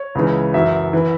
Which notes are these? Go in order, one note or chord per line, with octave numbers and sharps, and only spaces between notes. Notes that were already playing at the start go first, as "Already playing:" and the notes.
Already playing: C#5
C#2 C#3 E3
F#2 E3 E5
E3